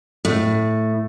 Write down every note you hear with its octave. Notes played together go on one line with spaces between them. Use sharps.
A2